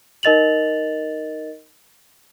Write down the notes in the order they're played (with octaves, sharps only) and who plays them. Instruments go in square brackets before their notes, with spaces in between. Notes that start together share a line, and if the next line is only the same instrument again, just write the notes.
[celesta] D#4 A#4 D#5 A6 F7 F#7